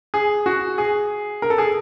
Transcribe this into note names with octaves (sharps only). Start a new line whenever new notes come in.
G#4
F#4
G#4
A#4
A4
G#4